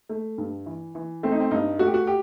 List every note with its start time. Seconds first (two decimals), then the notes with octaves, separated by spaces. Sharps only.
0.09 A3
0.38 G2
0.66 E3
0.95 E3
1.23 A3 C4
1.32 D#4
1.40 C4
1.51 G2 D#4
1.79 A3 F#4
1.87 G4
1.94 F#4
2.07 G4